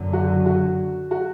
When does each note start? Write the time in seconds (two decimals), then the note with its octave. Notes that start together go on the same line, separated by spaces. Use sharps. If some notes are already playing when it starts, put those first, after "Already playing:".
Already playing: F#1 F#2 D3 F#3
0.13 F#4
0.46 F#4
1.11 F#4